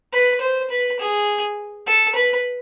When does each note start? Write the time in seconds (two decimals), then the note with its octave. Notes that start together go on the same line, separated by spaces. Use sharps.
0.13 B4
0.41 C5
0.71 B4
1.00 G#4
1.87 A4
2.15 B4